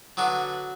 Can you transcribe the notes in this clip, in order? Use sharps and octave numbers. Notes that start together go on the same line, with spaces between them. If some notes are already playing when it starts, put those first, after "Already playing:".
D3 F#3 B3 F#4